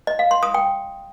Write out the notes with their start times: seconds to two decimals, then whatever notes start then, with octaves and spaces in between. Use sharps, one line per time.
0.07 D#5
0.19 F5
0.31 C6
0.43 D#6
0.54 G5